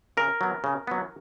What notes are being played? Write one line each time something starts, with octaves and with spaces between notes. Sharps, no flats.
C#3 A#4
F#3 B3
C#3
F#3 B3